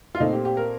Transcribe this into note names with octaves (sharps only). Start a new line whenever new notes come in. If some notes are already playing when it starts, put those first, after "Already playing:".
F4
A#2 A3 C4 D#4
G4
G4
A#4